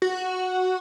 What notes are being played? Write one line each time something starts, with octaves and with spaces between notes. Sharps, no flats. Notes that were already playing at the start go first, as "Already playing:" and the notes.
F#4